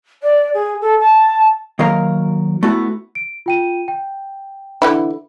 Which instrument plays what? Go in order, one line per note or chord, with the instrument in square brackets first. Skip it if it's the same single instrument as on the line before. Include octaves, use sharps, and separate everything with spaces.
[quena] D5
G#4
A4
A5
[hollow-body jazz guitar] D#3 F#3 A#3 A#4 F5 A#5
A3 B3 E4 F#4
[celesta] D7
F4 G5 D#7
G5
[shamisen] D3 E3 E4